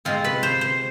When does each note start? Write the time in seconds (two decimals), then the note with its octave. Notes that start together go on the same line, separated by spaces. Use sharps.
0.05 C3 G#3 C4 F4
0.24 B4
0.43 C5
0.61 C5